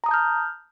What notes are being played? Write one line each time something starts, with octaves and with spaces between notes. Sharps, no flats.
A5 A#5 D#6 F6 G6